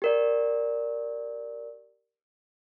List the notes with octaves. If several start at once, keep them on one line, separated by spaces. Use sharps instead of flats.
G4 A#4 D5